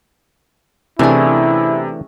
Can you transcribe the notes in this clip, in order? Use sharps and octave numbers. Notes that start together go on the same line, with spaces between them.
C3 E3 A3 C#4 D4 E4 G#4